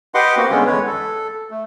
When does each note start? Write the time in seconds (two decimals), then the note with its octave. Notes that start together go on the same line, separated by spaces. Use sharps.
0.15 G4 B4 D#5 F#5 C6 D6
0.37 A#3 C4 F#4 G4
0.51 D3 G#3 B3 C#4
0.67 E2 G#3 B4 C#5
0.87 A4
1.51 A3